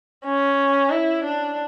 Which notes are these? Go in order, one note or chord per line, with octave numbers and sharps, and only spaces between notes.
C#4
E4
D4